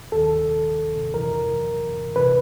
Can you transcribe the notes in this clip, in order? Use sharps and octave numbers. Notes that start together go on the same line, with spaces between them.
D#2 D#3 A4
F2 C3 E3 A#4
E2 C3 E3 B4